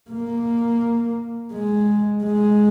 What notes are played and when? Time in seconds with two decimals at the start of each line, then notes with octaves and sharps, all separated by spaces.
0.10 A#3
1.52 G#3
2.24 G#3